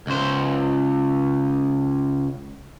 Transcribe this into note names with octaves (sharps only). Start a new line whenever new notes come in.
C#2 C5